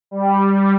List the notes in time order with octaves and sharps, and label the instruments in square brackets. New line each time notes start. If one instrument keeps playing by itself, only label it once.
[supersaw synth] G3